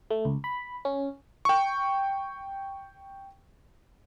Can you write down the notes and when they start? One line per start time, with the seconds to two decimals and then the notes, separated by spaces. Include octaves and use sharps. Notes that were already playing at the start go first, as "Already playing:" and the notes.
0.11 A3
0.25 C#2
0.44 B5
0.85 C#4
1.45 G5 C#6